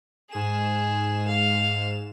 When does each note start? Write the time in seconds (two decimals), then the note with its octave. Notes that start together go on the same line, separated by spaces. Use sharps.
0.31 G#2 G#4 E7
1.28 F5